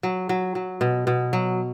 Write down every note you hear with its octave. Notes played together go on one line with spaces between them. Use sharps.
F#3
F#3
F#3
B2
B2
F#3